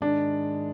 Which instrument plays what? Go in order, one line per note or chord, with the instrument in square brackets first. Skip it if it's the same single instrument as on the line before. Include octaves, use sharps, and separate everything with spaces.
[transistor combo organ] G#2 D#3 G#3 [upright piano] D4